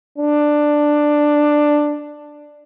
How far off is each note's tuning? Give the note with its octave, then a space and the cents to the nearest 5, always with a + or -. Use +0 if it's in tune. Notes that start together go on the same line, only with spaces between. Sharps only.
D4 +10